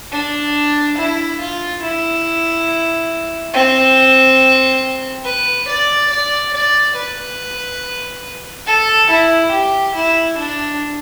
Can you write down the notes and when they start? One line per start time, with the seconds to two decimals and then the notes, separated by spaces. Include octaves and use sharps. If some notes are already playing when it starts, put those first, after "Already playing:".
0.12 D4
0.97 E4
1.40 F4
1.83 E4
3.54 C4
5.25 B4
5.67 D5
6.10 D5
6.53 D5
6.96 B4
8.66 A4
9.09 E4
9.52 G4
9.94 E4
10.38 D4